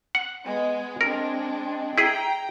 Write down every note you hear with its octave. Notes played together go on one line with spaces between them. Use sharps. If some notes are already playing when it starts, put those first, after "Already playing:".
F#5
G#3 B3
G#3 C4 D4 A#4
E4 G#4 G5 A#5